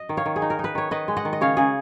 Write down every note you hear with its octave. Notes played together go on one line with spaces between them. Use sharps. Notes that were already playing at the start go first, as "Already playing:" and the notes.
Already playing: D#5
D#3
C#5 F5
D#3
G#4
D#4
A#4
D#4
B4
D#3 C#5
D#3 B4 D#5
G#3
D#5 F#5
D#3
D#5
C#3 C#5 F5
C#3 G#4